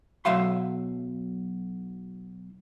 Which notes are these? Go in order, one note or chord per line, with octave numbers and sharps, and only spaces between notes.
B1 F#3 E5 F5 C6